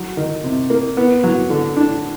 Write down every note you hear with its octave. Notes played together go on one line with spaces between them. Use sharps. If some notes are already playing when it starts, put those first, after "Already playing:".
Already playing: F#3
D#3
C3
A#3
B3
F#3
D3
D4